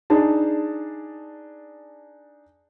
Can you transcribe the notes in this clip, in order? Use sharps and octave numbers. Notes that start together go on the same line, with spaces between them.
D4 D#4 G#4 A5